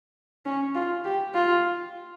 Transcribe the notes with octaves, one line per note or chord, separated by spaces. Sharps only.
C#4
F4
G4
F4